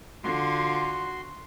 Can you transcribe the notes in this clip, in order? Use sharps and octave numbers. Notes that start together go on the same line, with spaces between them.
D3 F4 F#4 C6